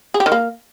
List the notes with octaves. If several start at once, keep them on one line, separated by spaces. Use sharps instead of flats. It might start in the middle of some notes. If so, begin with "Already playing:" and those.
G#4
G4
D#3
A#3